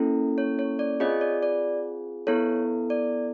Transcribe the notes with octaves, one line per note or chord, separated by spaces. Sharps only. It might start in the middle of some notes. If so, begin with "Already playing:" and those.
Already playing: A#3 C#4 E4 A4
C#5
C#5
D5
C4 F4 G#4 C#5 D#5
D5
D5
B3 E4 A4 C#5
D5